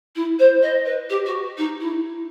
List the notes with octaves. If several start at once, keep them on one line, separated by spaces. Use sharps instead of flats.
E4
C5
D#5
B4
G4
F#4
D#4
E4